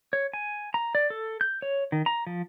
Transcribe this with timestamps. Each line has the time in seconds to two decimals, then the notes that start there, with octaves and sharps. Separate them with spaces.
0.13 C#5
0.33 G#5
0.74 A#5
0.95 D5
1.10 A4
1.41 G6
1.62 C#5
1.92 D#3
2.06 A#5
2.27 F3